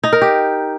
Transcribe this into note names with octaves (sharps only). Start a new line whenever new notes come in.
D#4
A#4
G4